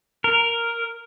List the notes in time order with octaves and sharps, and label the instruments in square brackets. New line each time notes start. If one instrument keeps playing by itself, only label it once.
[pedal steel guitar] A#4